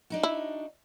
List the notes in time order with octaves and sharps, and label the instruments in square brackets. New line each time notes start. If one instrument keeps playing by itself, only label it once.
[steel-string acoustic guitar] D4 D#4 F#4
[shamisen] E4